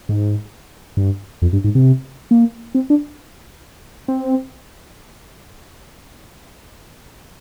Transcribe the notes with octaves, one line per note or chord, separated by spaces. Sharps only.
G#2
G2
F2
G2
G#2
C3
A#3
C4
D4
C4